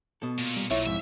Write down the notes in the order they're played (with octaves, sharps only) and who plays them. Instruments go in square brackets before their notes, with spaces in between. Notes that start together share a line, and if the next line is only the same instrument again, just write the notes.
[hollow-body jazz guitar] B2 A4
[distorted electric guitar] A#2
[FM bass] G3
[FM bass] B1 [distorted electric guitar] A#2 [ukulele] E4 [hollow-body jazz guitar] C#5
[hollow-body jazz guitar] F2 G#2 [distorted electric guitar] E5